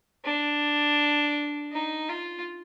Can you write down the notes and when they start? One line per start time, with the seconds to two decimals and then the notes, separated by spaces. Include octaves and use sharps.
0.25 D4
1.72 D#4
2.09 F4